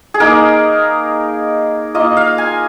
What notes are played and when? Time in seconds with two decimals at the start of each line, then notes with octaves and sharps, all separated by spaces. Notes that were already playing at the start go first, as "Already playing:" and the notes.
0.14 G#4
0.20 A#3 D#4 A#4
1.94 A#3 F4 D#5
2.17 F5
2.38 G#5